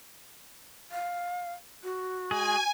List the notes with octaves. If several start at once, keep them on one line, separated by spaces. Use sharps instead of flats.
F5
F#4
G#3 G#4 G#5